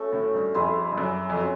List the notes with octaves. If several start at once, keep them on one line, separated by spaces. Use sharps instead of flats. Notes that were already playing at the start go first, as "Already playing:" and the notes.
Already playing: A3 C#4 F#4 A4
A2
G2
F2 C4 E4 G#4
G2
F#2
F2
C#4 F#4